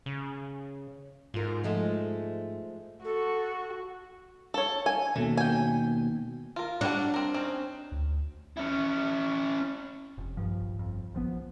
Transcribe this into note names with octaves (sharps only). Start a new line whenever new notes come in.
C#3
G#2 F4 A#4
F3 G#3 A3
F#4 A4
A4 C#5
G#5
D#2 B2 A3
G5 G#5
F4 A#4
F#3 G3 D4 F#5
C4 A#4
C4 C#4 D#4
D2
C#4 E4
F1
A#1 G2 F3
G1 F2
A#1 F3 B3